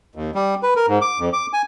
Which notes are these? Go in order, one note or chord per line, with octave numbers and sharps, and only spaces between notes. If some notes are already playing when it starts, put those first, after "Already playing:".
D#2
G3
B4
A#4
G#2
D6
F2
D6
G#5